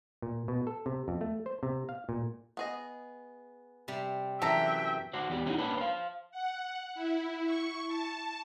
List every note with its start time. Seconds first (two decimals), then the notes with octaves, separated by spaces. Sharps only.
0.22 A#2
0.48 B2
0.67 A4
0.86 C3
1.08 F2
1.21 A3
1.46 C5
1.63 C3
1.89 F5
2.09 A#2
2.57 B3 G#4 D#5
3.88 C3 G3 C4
4.42 F#2 C3 E3 A4 E5 G5 A#5
5.13 F#4 C5 D5
5.30 E2 G4 D5
5.46 C#4 D#4 E4 F#4
5.58 A#3 C#4 D4 B4
5.78 C5 F5
6.31 F#5
6.95 E4
7.45 C#6
7.87 A5